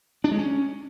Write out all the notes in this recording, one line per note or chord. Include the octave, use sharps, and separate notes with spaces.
D4
G#3
C#4